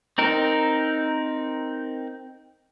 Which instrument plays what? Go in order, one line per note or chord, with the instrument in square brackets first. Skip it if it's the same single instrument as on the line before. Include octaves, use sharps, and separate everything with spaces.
[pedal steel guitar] C4 D#4 A#4